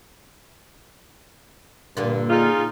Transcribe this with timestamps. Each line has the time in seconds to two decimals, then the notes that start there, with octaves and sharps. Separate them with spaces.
1.97 G2 A#2 D3 A#3
2.30 D#4 F4 G#4